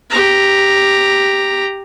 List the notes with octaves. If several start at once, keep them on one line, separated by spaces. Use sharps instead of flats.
G4 A#5